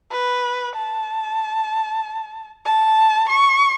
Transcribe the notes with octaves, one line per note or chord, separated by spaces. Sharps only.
B4
A5
A5
C#6